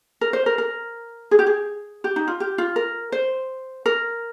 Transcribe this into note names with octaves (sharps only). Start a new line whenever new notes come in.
A#4
C5
A#4
A#4
G#4
G4
G#4
G4
D#4
F4
G4
F4
A#4
C5
A#4